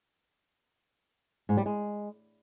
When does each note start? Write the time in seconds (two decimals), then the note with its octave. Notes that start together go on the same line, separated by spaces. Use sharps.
1.49 G#2
1.57 G3
1.66 G#3